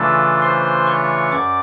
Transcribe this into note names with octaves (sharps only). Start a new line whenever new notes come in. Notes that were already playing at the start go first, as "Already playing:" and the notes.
Already playing: C#3 E3 A3 D4 F4 A4 A5
C5 C6
C#5 C#6
F#2 D5 D6